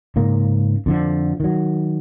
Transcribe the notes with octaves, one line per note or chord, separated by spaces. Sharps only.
G#2 C#3 A#3
F2 D3 F3
D#3 F#3